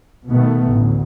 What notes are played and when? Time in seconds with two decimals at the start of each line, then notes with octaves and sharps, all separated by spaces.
0.27 B2 D#3 A3 B3
0.70 A1 D2